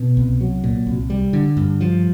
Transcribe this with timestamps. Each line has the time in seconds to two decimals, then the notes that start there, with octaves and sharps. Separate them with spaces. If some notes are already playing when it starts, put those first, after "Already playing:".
Already playing: B2
0.17 C2
0.41 F#3
0.64 A#2
0.87 C2
1.10 G3
1.33 D3
1.57 G2
1.81 F3